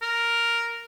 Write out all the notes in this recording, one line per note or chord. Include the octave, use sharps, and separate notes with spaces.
A#4